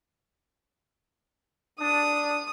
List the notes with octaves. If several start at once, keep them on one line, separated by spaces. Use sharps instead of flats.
D4 D#6